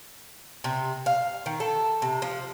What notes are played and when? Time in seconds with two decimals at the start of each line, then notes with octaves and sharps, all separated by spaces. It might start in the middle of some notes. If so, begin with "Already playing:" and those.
0.64 C3
1.06 F5
1.46 D#3
1.60 A4
2.02 C3
2.22 F3